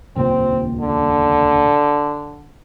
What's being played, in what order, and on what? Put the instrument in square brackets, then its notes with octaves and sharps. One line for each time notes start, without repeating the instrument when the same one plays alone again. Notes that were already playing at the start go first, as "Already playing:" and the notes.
[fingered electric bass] D#1 C#2 A#2 [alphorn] C4
[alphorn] D3